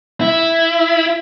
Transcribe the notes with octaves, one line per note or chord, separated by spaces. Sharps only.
E4